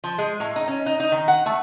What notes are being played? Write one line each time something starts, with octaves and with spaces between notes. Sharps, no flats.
F3
G#3
A2
D#4
C#4
D#4
D#4
D#3
F#5
A3